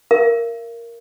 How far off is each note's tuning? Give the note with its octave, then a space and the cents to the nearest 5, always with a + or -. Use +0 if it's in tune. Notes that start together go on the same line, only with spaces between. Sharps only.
A#4 +0 F5 -45